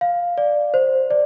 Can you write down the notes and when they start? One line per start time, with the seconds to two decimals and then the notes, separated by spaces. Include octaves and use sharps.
0.01 F5
0.38 D5
0.74 C5
1.10 D5